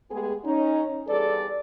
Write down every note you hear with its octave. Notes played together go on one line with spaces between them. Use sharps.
G#3 A3 B3 G4 G#4
C#4 D#4
E2 G3 G#4 A4 B4 D5